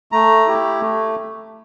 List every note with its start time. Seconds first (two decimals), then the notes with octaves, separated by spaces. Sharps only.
0.12 A3 A#5
0.47 E4 G4
0.81 A3